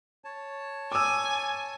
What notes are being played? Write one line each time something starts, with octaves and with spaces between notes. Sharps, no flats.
C#5 A5
G#5 D6 E6